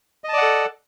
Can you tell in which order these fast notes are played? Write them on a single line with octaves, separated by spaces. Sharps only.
D#5 A5 D5 F#5 A4